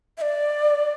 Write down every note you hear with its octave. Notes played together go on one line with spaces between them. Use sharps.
E5
D5